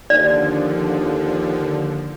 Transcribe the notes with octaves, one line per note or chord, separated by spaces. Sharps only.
D#2 D3 F3 D5